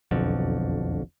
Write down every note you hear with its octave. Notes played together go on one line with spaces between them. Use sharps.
E1 B1 F2 D3